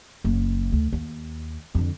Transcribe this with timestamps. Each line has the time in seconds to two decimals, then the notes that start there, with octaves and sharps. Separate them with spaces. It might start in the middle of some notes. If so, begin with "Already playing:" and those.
0.24 F#1
0.72 D2
0.93 D#2
1.75 F2 D3